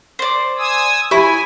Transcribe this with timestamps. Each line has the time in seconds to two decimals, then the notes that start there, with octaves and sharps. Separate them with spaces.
0.19 C5 D5
0.58 G#5 D#6 E6
1.11 E4 G4 G#5